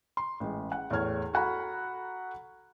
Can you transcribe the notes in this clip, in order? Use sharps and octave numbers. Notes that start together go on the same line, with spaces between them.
C6
A1 G#3
F#5
E2 A2 C#5 F6 G#6
F#4 A4 F#5 A#5 B5